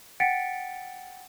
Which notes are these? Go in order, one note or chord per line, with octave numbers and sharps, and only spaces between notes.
F#5 G5 A6 B6 C#7 D7